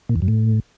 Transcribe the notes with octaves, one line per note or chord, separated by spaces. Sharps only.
A#2
E2
F#2
A2